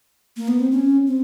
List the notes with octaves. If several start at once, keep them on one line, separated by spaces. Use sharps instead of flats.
A#3
B3
C4
C#4
C4